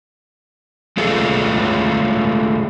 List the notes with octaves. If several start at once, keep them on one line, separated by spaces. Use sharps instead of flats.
G#3 A3 F4 G#4 A4